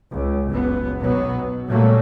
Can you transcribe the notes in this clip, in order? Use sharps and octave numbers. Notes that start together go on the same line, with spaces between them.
C#2
F#1 C#2 B3
B1 B2 F#3 B3
B2
A#2 C#3 F#3 G3 A3 A#3